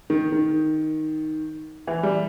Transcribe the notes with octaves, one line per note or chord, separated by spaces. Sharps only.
D#3
D#3
E3
G3